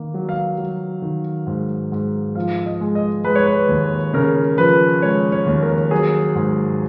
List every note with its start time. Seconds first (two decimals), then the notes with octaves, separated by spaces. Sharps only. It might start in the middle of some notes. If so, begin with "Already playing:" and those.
Already playing: D#3 A#3
0.14 F#3
0.29 F5
0.58 F#3
1.02 D#3
1.47 G#2
1.92 G#2
2.35 F3 F5
2.66 D#5
2.81 G#3
2.95 D#5
3.24 G#3 B4
3.35 C#5
3.46 B4
3.69 D#2
4.14 C#3 A#4
4.58 F3 B4
5.02 G#3 C#5
5.32 C#5
5.47 D#2
5.62 A#4
5.91 F#3 G#4
6.35 G#2